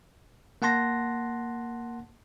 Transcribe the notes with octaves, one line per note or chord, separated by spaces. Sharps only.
A#3 F#5 A5 C6 A#6